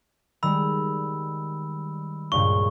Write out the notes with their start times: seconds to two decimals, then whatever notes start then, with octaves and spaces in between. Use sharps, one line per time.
0.43 D#3 G3 G#3 B5 E6
2.32 C#2 G2 A#2 C#6